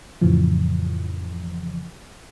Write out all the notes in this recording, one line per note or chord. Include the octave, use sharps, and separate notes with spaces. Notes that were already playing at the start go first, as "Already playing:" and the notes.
F2 A2 C#3 E3 F3